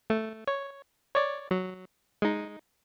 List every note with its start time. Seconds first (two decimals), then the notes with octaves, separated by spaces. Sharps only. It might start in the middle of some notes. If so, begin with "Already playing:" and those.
0.10 A3
0.47 C#5
1.15 C#5 D5
1.51 F#3
2.22 G#3 D#4